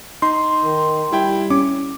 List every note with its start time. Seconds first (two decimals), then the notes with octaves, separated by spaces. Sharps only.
0.22 D#4 C6
0.64 D#3
1.13 G3 E4 G5
1.50 C#4 D6